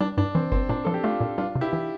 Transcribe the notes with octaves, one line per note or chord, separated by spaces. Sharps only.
G3 D4
G2 D4
E3 C4
G1 C4
A#2 D4
F3 A4
G4
A3 D4 F4
A#2
G3 D4 F4
C3
E4 G4
E3